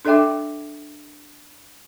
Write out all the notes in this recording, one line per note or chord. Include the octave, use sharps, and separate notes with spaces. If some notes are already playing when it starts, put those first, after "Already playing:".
D4 A4 D5 E5 G5 D6